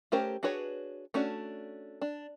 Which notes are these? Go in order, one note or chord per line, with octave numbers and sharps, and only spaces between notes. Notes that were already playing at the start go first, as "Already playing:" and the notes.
A3 C#4 G4 A#4 C5
D4 F#4 G#4 B4 C#5
A3 C#4 D4 F#4
D4